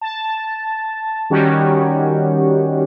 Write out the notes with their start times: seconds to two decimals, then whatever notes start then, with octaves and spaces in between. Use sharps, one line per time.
0.01 A5
1.30 D#3 G3 C#4 F#4 G4